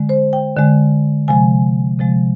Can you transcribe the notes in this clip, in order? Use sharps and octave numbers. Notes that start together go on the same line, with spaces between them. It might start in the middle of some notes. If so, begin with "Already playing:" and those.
Already playing: D3 G#3
C5
G5
D3 G#3
C3 F3 G#3 G#5
C3 F3 G#3